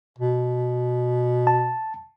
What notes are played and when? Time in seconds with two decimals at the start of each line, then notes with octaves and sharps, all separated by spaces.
0.18 B2
1.47 A5